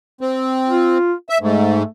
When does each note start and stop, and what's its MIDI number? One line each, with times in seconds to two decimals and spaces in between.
0.21 0.98 60
0.69 1.13 65
1.29 1.38 76
1.41 1.83 44
1.41 1.87 57